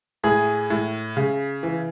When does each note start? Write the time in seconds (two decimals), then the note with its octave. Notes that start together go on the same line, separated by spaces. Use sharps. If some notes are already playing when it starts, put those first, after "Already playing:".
0.24 A2 G#4
0.70 A2
1.17 C#3
1.63 E3